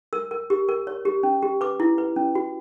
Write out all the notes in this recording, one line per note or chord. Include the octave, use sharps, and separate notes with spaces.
A#4 E6
A#4
G4
A#4
C#5
G4
C#4
G4
B4 D6
E4
B4
C#4
F#4